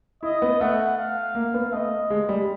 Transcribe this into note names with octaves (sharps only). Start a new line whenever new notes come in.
E4 D#5
B3
A3 F#5
F5
A#3
B3
A3 D#5
G#3
G3